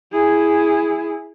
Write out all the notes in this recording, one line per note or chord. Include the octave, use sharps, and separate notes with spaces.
E4 G#4